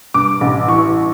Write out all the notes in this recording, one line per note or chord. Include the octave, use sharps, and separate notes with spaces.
G2 D6
A1
E3 C#6